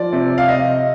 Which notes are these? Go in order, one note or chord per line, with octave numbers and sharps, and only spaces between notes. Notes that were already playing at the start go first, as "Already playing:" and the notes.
Already playing: F3 D5
C3
F5
D#5